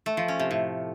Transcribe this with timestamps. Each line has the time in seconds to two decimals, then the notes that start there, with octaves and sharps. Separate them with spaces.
0.06 A3
0.17 F3
0.28 C#4
0.39 C3
0.51 A2